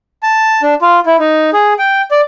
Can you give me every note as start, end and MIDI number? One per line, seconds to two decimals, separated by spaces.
0.23 0.61 81
0.63 0.74 62
0.82 1.00 65
1.06 1.16 64
1.19 1.50 63
1.53 1.73 68
1.79 2.02 79
2.11 2.21 74